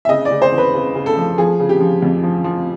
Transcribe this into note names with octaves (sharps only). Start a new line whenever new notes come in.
E5
C#3 D#5
D5
C#3
C5
E2
B4
C#3
C#3
A4
F3
F3 G#4
C#3
G4
F3
F2
F3
F3